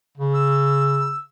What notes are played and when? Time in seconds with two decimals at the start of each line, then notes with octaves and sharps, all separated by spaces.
0.17 C#3
0.34 E6